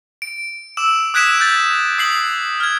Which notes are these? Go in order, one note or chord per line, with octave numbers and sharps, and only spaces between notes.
D7
D6 E6 E7
D#6 F#6 G#6 B6 D7 E7
F#6 G6 A6
D#6 C7 F#7
F6 G#6